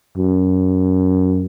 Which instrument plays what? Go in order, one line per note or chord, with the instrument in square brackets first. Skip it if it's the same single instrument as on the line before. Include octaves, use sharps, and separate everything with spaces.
[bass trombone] F#2